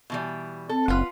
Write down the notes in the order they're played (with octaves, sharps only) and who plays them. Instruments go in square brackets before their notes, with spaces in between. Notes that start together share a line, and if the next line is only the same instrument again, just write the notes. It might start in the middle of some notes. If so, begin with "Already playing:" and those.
[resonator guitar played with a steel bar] B2 E3 G3
[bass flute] C4 [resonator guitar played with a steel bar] A4
[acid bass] F#1 [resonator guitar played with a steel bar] F4 B4 F#5